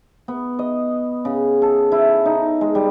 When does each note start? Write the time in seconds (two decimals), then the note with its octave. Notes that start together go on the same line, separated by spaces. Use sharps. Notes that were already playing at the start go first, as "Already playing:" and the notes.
0.28 B3
0.59 D#5
1.25 C#3
1.62 A4
1.92 E4
2.26 D#4
2.61 G#3
2.75 G3